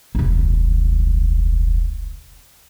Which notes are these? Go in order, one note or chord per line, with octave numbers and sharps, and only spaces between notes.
E1 C#2